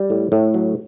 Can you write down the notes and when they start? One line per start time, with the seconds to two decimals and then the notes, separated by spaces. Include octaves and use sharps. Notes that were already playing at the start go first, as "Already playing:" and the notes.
Already playing: G3
0.10 A2
0.32 A2
0.54 F#3